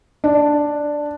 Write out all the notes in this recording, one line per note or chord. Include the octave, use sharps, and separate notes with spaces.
D4